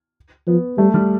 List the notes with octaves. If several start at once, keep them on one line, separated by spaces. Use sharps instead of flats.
F3 B3
G3 A3
G3